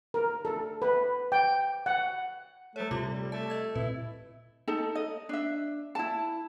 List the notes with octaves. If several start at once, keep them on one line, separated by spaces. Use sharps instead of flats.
A#4
A4
B4
G5
F#5
G3 A3 C#5
C3 A3 F4 G4 D6
G3
A3 A5
D#5 G#6
A#2 C4 E4 B4
D#4 A4 A5
D#5
D4 E5
E4 A5